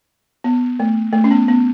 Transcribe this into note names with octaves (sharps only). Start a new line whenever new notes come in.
B3
A3
A3
C#4
B3
B3